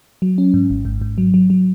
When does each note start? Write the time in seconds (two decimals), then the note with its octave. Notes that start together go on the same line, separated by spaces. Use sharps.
0.22 F#3
0.38 C#4
0.54 G#2
0.70 G#1
0.85 G#2
1.01 G#2
1.18 F#3
1.34 F#3
1.50 F#3